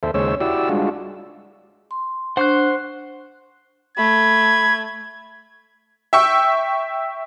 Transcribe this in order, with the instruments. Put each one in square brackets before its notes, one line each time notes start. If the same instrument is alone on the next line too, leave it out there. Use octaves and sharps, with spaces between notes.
[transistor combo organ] D#2 A4 C5 E5
D#2 C#3 G#3 C5 C#5 E6
E4 F#4 G4 D5 E6
G3 G#3 D4 F4 F#4
[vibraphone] C6
[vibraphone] D4 [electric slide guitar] C5 [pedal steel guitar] F#5 C#6 F#6
[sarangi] A3 [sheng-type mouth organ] B5 [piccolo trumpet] G#6
[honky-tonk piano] E5 G5 C#6 E6